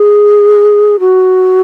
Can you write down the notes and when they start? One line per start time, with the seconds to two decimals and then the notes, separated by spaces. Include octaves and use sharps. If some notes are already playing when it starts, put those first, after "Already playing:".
Already playing: G#4
1.00 F#4